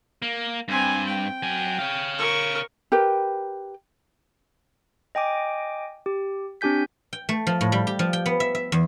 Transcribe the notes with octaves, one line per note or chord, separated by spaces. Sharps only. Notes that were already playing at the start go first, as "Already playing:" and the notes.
A#3
G2 C4 G#5
G5
F#3 G#5
C#5 F5
A#4 C#6
G4 A#4 B4 G5
D#5 G5 G#5 D6
G4
C4 D4 G4 G#5 G6 B6
G5
A3
F3
A2
G3
G4
F3
G5
B3
E5
E5
E2